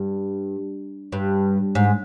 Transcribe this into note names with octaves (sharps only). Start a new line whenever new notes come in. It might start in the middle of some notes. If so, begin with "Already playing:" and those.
Already playing: G2
G2
G#2